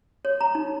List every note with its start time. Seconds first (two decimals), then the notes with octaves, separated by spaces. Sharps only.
0.25 C#5
0.41 A#5
0.55 D#4